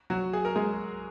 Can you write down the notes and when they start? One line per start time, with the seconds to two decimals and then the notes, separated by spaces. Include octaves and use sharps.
0.10 F#3 F#4
0.33 G#4
0.45 A#4
0.55 G#3 G#4